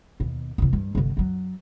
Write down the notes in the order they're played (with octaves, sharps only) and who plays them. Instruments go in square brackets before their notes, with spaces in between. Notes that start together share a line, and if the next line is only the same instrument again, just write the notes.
[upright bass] D#2 B2
E2 C3
G2 G3
G1 C3
F#2 F#3